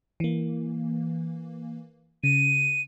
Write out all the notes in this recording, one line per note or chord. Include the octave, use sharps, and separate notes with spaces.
E3 A#3
C#3 D#7